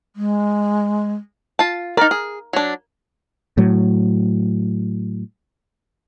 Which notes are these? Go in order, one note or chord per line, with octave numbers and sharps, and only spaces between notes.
G#3
F4 A5
D#4 A#4 D5
G#4
F#3 D4
A2 F#3